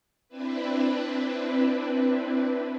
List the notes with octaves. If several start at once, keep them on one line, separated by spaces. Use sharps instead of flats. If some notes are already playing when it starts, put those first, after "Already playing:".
C4 D4 E4 B4